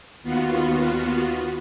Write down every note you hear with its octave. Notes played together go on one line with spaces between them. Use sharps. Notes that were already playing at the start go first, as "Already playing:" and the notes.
D#2 B3 F4 F#4